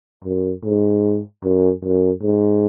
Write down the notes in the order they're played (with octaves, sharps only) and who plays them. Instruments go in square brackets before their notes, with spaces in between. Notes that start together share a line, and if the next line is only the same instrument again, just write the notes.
[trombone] F#2
G#2
F#2
F#2
G#2